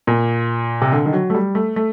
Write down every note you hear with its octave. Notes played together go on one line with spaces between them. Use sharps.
A#2
C3
D3
D#3
F#3
A3
G3
A3
A3